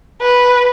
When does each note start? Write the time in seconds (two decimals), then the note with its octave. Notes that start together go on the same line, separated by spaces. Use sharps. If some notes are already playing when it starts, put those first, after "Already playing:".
0.21 B4